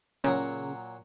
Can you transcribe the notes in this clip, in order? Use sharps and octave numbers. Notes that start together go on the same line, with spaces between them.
A#2 C#3 F#3 A#5